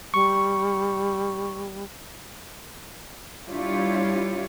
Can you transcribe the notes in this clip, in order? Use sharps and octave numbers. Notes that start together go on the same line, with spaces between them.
G3 C#6
G3 D4 E4 F4 G4 C#5